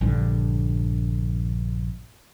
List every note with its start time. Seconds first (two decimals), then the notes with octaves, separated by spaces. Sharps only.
0.01 A#1 G2 D3